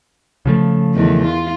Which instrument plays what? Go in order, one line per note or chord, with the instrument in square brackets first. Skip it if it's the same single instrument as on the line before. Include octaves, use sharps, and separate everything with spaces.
[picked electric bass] C#3 F3 A3
[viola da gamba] E2 D#3
F4